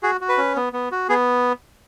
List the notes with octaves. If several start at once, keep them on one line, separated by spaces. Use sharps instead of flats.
F#4 G#4
F#4
B4
C#4
B3
B3
F#4
B3 G#4